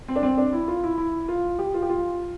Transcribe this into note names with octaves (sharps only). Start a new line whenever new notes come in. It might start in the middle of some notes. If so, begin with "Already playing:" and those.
C4
D4
C4
D4
E4
F4
E4
E4
F4
G4
F4
G4
F4